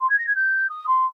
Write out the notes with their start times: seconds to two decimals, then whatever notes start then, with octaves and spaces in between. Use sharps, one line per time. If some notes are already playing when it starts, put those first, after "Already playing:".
0.01 C6
0.10 G#6
0.18 A#6
0.27 G#6
0.35 G6
0.70 D#6
0.87 C6